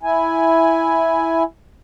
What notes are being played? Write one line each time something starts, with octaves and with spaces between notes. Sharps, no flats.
E4 G#5